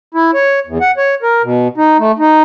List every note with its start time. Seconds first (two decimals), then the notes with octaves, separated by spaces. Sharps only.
0.14 E4
0.34 C#5
0.67 E2
0.81 F#5
0.98 C#5
1.23 A#4
1.43 B2
1.77 D#4
1.99 A3
2.19 D#4